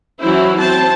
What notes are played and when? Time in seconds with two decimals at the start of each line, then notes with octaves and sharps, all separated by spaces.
0.20 E3 F#3 C#4 E4 C5
0.59 C4 C5 A5